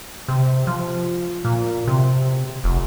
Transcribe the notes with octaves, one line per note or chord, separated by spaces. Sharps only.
C3
F3
A#2
C3
F1